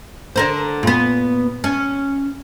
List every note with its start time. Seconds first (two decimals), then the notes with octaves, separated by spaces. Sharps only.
0.36 D3 A#4 C5
0.83 A#2 B3
1.64 C#4